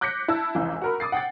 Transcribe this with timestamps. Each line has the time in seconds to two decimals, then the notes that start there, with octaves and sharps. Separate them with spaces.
0.01 D6 F#6 G6 A#6 B6 C#7
0.28 E4 A5 E6
0.55 F1 C#2 E3
0.82 F#4 A#4 B5
1.00 D6 D#6 A6 C7
1.12 F#5 G5 A6